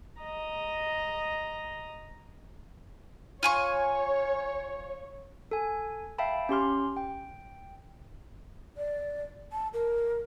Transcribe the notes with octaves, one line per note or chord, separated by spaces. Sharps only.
D#5 A#5
F4 C#5 G#5 C#6
A4 G#5
E5 F5 G5 A5 B5
C#4 G4 C6 F6
G5
D5
A5
A#4